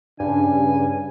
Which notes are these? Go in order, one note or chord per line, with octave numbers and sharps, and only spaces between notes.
G2 C#3 D4 G#5